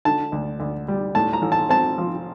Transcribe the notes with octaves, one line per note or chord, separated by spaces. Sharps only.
D3 A5
D2
D2
G3
A2 A5
A#5
A1
A5
C4 A5
F3